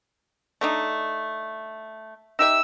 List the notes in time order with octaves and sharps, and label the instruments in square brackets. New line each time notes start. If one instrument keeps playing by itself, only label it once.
[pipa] A3 D4 D#4
[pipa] D#4 G4 E5 [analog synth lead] E6